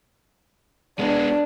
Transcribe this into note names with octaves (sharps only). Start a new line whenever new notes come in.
G#3 B3 D4